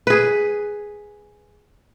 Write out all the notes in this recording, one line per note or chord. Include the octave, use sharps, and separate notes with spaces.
G#4 B4